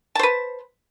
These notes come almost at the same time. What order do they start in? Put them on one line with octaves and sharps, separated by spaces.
A5 C5 B4